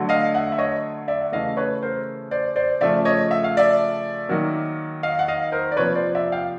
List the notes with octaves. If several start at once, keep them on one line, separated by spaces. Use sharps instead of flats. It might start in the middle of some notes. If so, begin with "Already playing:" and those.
Already playing: D3 F#3 A3
D#5 F5
E5 F#5
E5
C#5 D#5
D5 E5
C#3 E3 A3 D#5 F5
B4 C#5
A#4 C5
C5 D5
C5 D5
C#3 F3 A3 D5 E5
C#5 D#5
E5
F5
D5 E5
D#3 F#3 A#3
D#5 F5
F#5
D#5 F5
A#4 C5
D5
C3 F3 A#3 B4 C#5
C5 D5
D5 E5
F5 G5